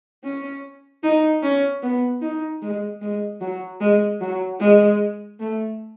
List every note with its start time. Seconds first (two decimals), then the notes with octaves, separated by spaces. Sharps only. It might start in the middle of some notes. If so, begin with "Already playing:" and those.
0.24 C#4
1.03 D#4
1.43 C#4
1.83 B3
2.21 D#4
2.62 G#3
3.01 G#3
3.40 F#3
3.80 G#3
4.21 F#3
4.60 G#3
5.40 A3